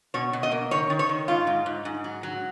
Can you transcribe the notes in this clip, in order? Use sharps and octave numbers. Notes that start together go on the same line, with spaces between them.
B2 C#5
B2
D#5
A#3
D#3 C#5
D#3
C#5
D#3
G#2 F4
G#2
G#2
G#2
F#3
F#3